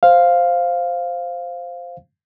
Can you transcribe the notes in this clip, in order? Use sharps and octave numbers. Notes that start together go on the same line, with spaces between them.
C5 F5